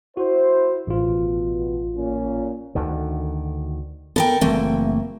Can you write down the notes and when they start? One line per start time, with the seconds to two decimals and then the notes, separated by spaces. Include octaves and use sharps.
0.17 E4 F#4 C5
0.87 A1 B2 F4
1.96 A#2 C#4
2.75 D2 D3 D#3
4.16 B3 A4 A#4 G5
4.41 F#1 E3 A3 A#3 C4